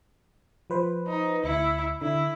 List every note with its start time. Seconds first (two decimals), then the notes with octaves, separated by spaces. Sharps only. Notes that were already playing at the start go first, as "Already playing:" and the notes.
0.70 F3 B4 C5
1.07 D#4
1.44 D2 E4 C#7
2.01 D3 E4